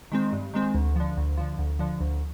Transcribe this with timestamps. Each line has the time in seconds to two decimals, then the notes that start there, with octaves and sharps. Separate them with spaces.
0.12 D#3 G#3 C4
0.33 G2
0.54 D#3 G#3 C4
0.75 D2
0.96 D3 F3
1.17 D2
1.37 D3 F3
1.59 D2
1.79 D3 F3
2.00 D2